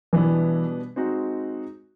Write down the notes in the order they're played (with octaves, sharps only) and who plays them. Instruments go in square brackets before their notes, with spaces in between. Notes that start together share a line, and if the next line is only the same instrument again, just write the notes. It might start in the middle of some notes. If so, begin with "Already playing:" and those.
[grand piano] B2 G3 B3 D4 [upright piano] E3
[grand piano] G#3 C4 D#4 F#4